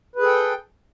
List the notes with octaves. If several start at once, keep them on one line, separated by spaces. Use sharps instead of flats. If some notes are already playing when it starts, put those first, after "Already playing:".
G#4 A4 B4 G5